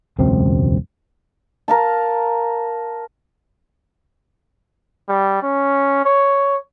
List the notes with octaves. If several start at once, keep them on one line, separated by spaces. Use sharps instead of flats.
E1 C#2 F#2 C4
A#4 F5 A5
G3
C#4
C#5